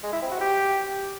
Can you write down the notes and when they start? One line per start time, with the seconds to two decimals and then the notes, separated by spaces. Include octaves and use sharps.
0.03 G#3
0.13 E4
0.22 C4
0.32 F#4
0.41 G4